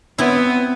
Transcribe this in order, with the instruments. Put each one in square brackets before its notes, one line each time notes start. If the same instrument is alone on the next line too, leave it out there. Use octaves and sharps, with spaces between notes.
[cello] B3 [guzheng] C4 E4